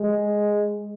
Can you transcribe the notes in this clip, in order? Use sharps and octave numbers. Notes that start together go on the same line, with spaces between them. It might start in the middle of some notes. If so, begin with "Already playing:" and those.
Already playing: G#3